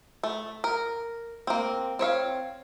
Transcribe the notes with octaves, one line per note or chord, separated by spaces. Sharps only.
A3
A#4
A#3 C4
C4 C#5 E5 F5